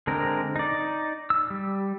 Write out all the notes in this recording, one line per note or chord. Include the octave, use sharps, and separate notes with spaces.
D3 G#3 C4 A#4
D#4 D5
E6
G3